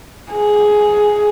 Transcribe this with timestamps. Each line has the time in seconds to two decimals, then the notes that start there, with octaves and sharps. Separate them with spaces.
0.31 G#4